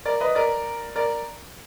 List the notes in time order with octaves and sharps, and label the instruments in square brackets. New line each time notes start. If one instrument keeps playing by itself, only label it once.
[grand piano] A#4 D5
B4 D#5
A#4 D5
A#4 D5